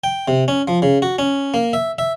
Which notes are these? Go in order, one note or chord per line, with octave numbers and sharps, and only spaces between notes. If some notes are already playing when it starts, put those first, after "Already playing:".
G5
C3
C#4
F3
C#3
F#4
C#4
A#3
E5
E5